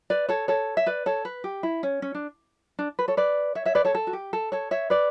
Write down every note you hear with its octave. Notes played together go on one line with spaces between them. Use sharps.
B4 D5
A4 C#5
A4 C#5
E5
B4 D5
A4 C#5
B4
G4
E4
C#4
C#4
D4
D4
B4
A4 C#5
B4 D5
C#5 E5
C#5 E5
B4 D5
A4 C#5
A4
F#4
G4
A4
A4 C#5
C#5 E5
B4 D5